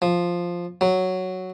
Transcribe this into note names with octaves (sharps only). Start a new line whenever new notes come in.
F3
F#3